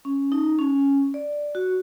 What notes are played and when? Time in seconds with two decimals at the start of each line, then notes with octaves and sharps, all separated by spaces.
0.05 C#4
0.32 D#4
0.59 C#4
1.14 D5
1.55 F#4